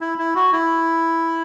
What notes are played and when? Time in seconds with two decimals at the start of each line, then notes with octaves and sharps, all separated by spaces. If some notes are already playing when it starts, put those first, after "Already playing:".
0.01 E4
0.18 E4
0.35 F#4
0.53 E4